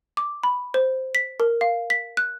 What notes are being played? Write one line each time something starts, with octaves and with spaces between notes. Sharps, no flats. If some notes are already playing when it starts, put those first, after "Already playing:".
D6
B5
C5
B6
A#4
F5
B6
F#6